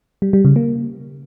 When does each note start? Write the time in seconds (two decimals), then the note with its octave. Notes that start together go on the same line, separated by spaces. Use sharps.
0.22 G3
0.33 G3
0.45 C#3
0.56 A#3